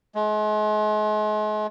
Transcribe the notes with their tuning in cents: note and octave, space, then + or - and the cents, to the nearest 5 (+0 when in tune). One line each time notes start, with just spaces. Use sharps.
G#3 +40